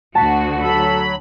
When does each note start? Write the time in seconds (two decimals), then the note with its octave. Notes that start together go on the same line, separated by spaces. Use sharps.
0.15 D2 F#4 A5 B6
0.59 F#3 A4 B5